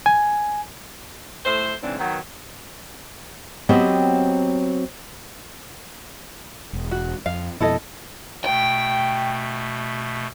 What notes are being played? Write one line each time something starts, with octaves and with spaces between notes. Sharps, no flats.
G#5
A2 A3 C5
G#2 C#3 E3 C4 D4
D#3 F#3 B3
F#3 B3 C4 G4 D#5
E1
F#4
F2 F5
F2 B2 E4 A4 D#5
B2 A3 G5